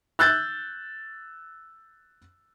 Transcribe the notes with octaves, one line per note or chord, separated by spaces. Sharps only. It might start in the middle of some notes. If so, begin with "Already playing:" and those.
E6 F#6 G6 A6